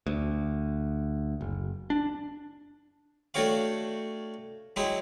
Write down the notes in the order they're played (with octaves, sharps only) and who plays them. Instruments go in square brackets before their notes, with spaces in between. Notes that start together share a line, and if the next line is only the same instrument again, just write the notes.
[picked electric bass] D2
F#1
D4
[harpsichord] A3 D4 F#4 G4 C#5 F5
F#3 G#3 E4 G4